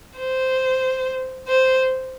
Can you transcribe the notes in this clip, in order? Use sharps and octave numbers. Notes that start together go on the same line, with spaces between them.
C5
C5